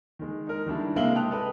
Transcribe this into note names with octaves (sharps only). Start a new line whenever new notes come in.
D#3 G#3
D#4 A#4
D#3 G3 D4 E4
C3 G#3 A#3 E5 F#7 G7
G5 A5 D#6 F#6 F7
A4 B4 D#5 G5